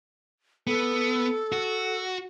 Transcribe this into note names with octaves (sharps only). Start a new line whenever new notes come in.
B3 A4
F#4